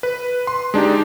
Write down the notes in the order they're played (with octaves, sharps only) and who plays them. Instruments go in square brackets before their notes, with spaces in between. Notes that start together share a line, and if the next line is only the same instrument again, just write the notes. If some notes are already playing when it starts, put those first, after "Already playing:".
[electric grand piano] B4
C6
G#3 D4 D#4 G4